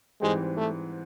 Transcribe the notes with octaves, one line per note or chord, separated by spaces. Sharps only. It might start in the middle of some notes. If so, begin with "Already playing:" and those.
G#2 E3 G3 G#3 C4
A3